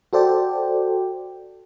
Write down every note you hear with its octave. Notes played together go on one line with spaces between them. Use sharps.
F#4 A4 C5 D5 G5